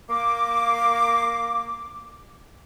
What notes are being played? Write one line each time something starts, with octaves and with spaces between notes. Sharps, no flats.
A#3 D6